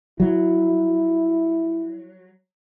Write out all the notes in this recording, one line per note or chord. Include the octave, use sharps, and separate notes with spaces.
F#3 E4